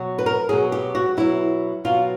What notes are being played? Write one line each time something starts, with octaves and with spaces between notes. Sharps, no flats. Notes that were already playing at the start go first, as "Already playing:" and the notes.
Already playing: B2 F#3
B4
A#4
B2 F#3 G#4
G4
F#4
B2 F#3 E4
B2 F#3 F4